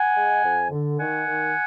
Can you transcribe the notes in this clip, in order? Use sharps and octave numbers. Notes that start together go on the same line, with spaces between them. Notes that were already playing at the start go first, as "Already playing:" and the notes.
Already playing: F#5 G#5
G#3
F2
D3
D#3 F#5 G#5
D#3